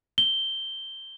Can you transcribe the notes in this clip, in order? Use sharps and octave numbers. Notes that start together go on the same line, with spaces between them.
G7